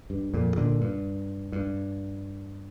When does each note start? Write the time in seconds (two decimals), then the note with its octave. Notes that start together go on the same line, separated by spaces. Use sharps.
0.10 G2
0.34 F2 A#2
0.57 A#2 D3
0.81 G2
1.52 G2